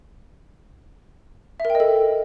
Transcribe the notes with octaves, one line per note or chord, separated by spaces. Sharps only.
E5
A#4
G5
D#5
A4